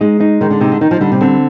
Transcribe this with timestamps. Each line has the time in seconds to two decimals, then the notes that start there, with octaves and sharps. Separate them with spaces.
0.01 G#3 D#4
0.21 D#4
0.41 D#3 G#3
0.50 D3
0.61 C3 D#4
0.72 D3
0.81 D#3 D#4
0.91 F3
1.01 D3 G3
1.12 C3
1.21 D3 C4